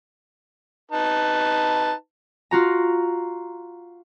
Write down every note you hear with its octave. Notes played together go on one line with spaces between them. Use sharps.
D#4 B4 A5
F4 F#4 A#5